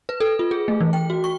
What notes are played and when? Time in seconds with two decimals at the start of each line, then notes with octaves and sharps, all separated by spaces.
0.09 B4
0.20 A4
0.39 F4
0.51 G#4
0.68 A3
0.81 E3
0.93 G5
1.10 F#4
1.24 C#6